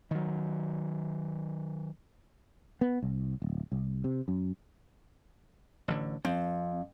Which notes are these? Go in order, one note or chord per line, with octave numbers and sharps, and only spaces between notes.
D#3 F#3
B3
C2
D1
C2
C3
F#2
A1 D3
F2 C4